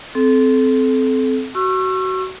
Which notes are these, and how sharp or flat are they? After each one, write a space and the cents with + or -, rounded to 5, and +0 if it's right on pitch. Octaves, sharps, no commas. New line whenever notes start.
C4 -15 A4 -25
F#4 +25 C#6 -25 E6 +35